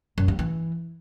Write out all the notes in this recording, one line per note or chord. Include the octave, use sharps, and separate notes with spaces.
F#2
G3
E3